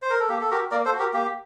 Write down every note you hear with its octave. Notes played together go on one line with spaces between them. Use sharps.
C5
A#4
A4
A#3 G4
A4
F#4 G4 A#4
A#3 A#4 D5
A4 C5
F#4
G4 A#4
A#3 G4